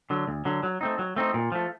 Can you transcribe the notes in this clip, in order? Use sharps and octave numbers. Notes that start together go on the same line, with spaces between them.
D3 F#3
D2
D3 F#3
F#3
A3 C4 D#4
F#3
A3 C4 D#4
A#2
F3 A3